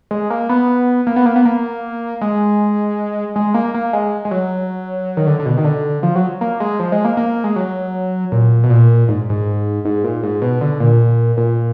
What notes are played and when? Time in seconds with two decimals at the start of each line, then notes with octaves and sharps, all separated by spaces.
0.11 G#3
0.30 A#3
0.49 B3
1.07 A#3
1.16 B3
1.26 A#3
1.36 B3
1.45 A#3
2.21 G#3
3.36 G#3
3.54 A#3
3.74 A#3
3.93 G#3
4.25 G#3
4.31 F#3
5.17 D#3
5.27 D3
5.39 D3
5.46 B2
5.57 D#3
5.64 D3
6.03 F3
6.15 F#3
6.41 A#3
6.60 G#3
6.79 F3
6.92 G#3
7.05 A#3
7.17 A#3
7.44 G#3
7.56 F#3
8.32 A#2
8.64 B2
8.70 A#2
9.08 G#2
9.30 G#2
9.85 G#2
10.04 A#2
10.23 G#2
10.42 B2
10.61 D3
10.80 A#2
11.37 A#2